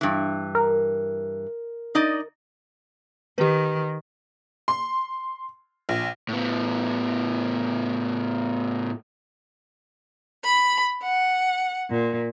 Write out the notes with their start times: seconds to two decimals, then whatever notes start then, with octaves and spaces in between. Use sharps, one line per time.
0.01 G2 E3
0.55 A#4
1.95 D#4 D5 D#5
3.38 D#3 G4 B4
4.68 C6
5.89 A#1
6.29 A2 B3
10.43 B5
11.01 F#5
11.88 A#2